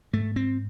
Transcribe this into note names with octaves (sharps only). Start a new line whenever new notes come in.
G#2 A3
C4